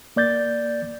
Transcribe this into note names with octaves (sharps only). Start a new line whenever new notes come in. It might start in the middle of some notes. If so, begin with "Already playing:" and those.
A#3 D5 G6 A6